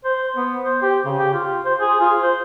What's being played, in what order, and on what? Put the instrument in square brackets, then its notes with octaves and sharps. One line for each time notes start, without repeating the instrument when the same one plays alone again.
[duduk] C5
B3
C5
G4
C#3
G4
F4
C5
G#4
F4
C5